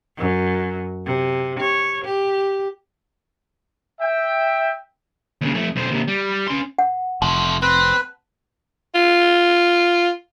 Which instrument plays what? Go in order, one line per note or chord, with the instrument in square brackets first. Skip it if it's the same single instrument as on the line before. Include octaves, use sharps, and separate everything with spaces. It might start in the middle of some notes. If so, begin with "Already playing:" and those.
[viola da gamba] F#2
C3
C#5
G4
[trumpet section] E5 G5
[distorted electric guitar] D#2 C#3
F2 A3
B1 C5
D#2 C3
G3
C#4 C6
[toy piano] F#5
[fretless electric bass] F1 [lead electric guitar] F3 A3 [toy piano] A5
[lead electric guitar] C4 [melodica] B4
[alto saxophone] F4